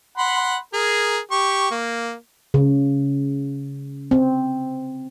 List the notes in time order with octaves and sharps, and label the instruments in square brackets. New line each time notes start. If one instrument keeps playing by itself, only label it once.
[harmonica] F#5 B5 C6
G#4 A#4
G4 C#6
A#3
[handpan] C#3
C4